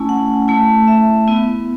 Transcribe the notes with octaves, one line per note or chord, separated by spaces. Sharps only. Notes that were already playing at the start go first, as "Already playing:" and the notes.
Already playing: A3 C#4 E4 G#5
F#5
A3 E4
E5
B3 E4